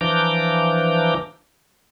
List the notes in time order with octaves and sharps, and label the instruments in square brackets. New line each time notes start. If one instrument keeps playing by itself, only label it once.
[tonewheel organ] E3 F3 D4 A#5 D6 G6